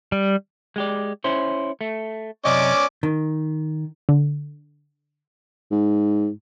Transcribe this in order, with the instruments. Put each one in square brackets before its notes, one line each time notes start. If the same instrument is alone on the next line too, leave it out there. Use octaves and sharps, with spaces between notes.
[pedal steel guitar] G3
[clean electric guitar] G#3 G4 D5
C#4 E4 C5
A3
[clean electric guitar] F#2 C3 D#5 [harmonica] C#4 D5 D6
[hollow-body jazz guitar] D#3
[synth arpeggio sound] D3
[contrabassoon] G#2